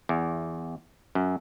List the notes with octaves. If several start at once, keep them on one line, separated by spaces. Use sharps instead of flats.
E2
F#2